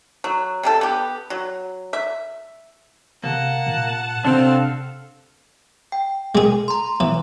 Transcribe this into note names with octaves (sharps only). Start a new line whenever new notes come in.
F#3
C3 D#4 A4
B3 G4
F#3
E5
C3 A#3 F#5 A5
A#2
C3 C4 D4 A4 F5
G5
G#3 G#4
A#5 C6
E3